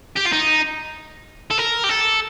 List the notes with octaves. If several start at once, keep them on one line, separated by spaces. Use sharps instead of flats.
G4
F4
D#4
A4
A#4
G4
A4